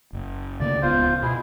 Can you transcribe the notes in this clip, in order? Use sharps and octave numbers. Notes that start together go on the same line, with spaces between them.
F#1
D2 C#3 A#3 D5
D1 C#2 B3 F4 C5
B2 E4 G#4